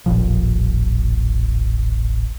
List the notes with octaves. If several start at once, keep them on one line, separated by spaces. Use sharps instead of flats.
D#1 A1 A#2 F3